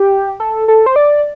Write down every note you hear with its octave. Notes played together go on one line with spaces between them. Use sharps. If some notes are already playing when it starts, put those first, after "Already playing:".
Already playing: G4
A4
A4
C5
D5